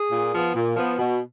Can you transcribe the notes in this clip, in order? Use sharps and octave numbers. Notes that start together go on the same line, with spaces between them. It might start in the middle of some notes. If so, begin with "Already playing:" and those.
Already playing: G#4
A#2
F3 B3
A#2
F3 B3
B2